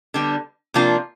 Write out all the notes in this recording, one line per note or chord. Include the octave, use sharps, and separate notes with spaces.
D3 G3 B3
C3 F3 A#3 D4 F4